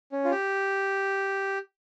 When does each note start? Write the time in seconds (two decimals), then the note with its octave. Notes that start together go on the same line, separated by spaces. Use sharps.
0.12 C#4
0.25 F4
0.31 G4